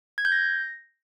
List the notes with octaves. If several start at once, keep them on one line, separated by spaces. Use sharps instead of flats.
G#6
G6
A#6